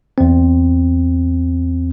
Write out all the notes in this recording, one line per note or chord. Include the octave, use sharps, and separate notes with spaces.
E2 C4